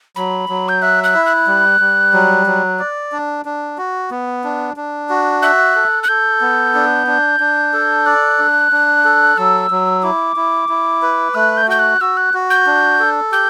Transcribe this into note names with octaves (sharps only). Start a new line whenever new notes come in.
F#3 B5
F#3
G6
E5 F#6
F#6
E4
F#6
G3
G3
F#3
F#3
D5
D4
D4
F#4
B3
D4
D4
F#4
E5 F#6
A4
F#6
A4 G6
B3
D4
D4
D4
A4
D5 F#6
D4
D4
A4
F#3 E6
F#3
E4 D6
E4
E4
B4
A3 F#6
G6
F#4 G6
F#6
F#4 E6
F#6
F#4
G6
D4
A4
G4 G6